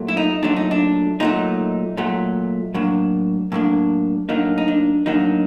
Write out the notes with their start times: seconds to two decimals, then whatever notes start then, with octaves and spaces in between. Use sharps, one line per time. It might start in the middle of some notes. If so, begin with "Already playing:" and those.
Already playing: A#2 F#3 A3
0.08 E4
0.17 D#4
0.43 A#2 F#3 A3 D4
0.56 D#4
0.71 D4
1.20 A#2 F#3 A3 D#4
1.97 A#2 F#3 A3
2.74 A2 F#3 A#3 D4
3.52 A2 F#3 A#3 D4
4.29 A2 F#3 A#3 D4 D#4
4.58 D#4
4.68 D4
5.06 A2 F#3 A#3 D4 D#4